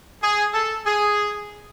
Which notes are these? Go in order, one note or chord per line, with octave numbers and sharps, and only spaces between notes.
G#4
A4
G#4